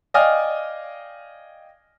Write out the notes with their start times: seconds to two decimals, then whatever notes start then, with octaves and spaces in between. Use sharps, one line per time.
0.14 D5 D#5 F5 G5 G#5 F6